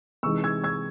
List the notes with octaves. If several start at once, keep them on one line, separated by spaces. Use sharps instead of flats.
C3 E3 G#3 D#4 C#6 E6
E6 G#6
E6 G#6